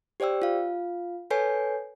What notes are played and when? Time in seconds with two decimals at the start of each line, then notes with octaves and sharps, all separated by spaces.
0.20 G4 C5 D5 G5 E6
0.42 F4 F5
1.30 A4 B4 C#5 G#5 G6 C7